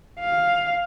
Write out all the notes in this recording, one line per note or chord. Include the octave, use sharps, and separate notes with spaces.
F5